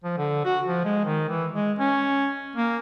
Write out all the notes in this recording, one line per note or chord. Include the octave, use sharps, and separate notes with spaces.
F3
D3
F#4
F3
G#3
D#3
E3
G#3
C#4
A#3